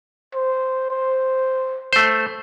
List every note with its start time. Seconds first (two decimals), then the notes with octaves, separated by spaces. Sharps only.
0.34 C5
0.91 C5
1.93 A3 C5